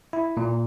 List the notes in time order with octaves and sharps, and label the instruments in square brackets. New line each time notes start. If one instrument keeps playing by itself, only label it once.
[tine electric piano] E4
A#2